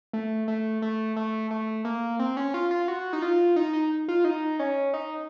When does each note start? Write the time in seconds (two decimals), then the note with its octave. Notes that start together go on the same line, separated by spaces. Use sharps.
0.13 A3
0.48 A3
0.82 A3
1.16 A3
1.51 A3
1.85 A#3
2.19 C4
2.37 C#4
2.54 F4
2.71 F4
2.88 F#4
3.13 D#4
3.22 F4
3.56 D#4
3.73 D#4
4.08 F4
4.25 D#4
4.59 C#4
4.94 D#4